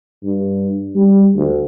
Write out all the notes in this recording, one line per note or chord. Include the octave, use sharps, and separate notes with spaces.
G2
G3
D2